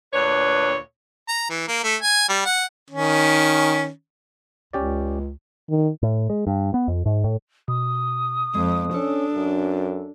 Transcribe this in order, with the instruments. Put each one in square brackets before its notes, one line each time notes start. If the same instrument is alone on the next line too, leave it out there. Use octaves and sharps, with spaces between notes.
[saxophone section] D2 A#2 D4 B4 C#5
[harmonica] A#5
E3
A#3
A3
G#5
G3
F#5
D#3 C#4
[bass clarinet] C#2 [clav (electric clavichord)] C#4 G4 D5
[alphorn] D#3
[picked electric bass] A2
G#3
G2
B3
F2
G#2
A2
[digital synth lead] B2 [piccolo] D#6
[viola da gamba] F2 [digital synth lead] G#3
[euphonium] C#4 [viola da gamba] D4 [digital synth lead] A4
[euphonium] F#2